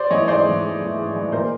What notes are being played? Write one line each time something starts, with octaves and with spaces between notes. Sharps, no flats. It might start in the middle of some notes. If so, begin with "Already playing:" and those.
Already playing: C5 D5
E3 A3 C#5 D#5
G#2 C5 D5
E3 A3
G#2
E3 A3
G#2
E3 A3
A#2 A#4 C5